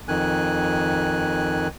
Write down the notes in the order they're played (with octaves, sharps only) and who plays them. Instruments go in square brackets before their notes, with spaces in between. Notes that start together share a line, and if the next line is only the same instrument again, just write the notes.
[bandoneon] F2 D#3 G#5 F#6